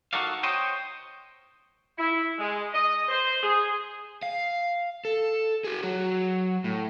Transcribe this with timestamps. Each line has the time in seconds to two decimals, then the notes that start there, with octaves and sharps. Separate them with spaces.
0.13 D#4 F#4 A4 A#4 D5 F5
0.43 C5 C#5 D#5 G5
1.98 E4
2.39 G#3
2.73 D#5
3.09 C5
3.42 G#4
4.23 F5
5.05 A4
5.64 F#4 G#4
5.83 F#3 F#4
6.64 A2